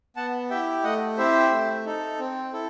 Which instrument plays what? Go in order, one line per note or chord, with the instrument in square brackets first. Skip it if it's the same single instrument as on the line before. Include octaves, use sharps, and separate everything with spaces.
[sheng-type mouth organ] B3 F#5 A5
E4 G4 E5 G5
A3 D#5 F#5
C4 E4 G4 C5 E5
A3
D#4 A4
C4
E4 A4